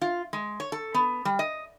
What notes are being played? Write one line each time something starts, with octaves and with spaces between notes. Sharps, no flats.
F4
G#3
C#5
A4
B3
G3
D#5